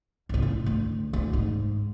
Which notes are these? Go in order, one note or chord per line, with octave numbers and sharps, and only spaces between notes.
G#1 C#2
A2
D2
D2 A2
G#2